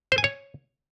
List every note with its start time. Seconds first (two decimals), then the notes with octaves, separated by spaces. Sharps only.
0.12 C5
0.18 G#5
0.24 C#5